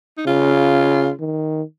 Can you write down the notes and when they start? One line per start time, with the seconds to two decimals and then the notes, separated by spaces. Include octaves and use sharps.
0.18 D#4
0.26 C#3 F4
1.20 D#3